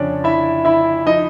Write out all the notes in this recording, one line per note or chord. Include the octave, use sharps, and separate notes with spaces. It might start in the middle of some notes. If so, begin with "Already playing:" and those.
Already playing: F2 C#3 F3 C#4 D4 C#5 D5
E4 E5
E4 E5
F3 D#4 D#5